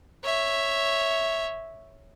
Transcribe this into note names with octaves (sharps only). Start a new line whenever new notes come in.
C#5 E5